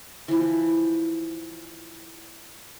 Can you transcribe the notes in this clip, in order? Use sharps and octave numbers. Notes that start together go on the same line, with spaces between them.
E3 F3